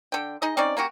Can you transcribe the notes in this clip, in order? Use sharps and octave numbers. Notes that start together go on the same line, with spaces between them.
D3 G5
D#4 G#4 D#5
C4 C#4 D#4 D5
A#3 C#4 F#4 G4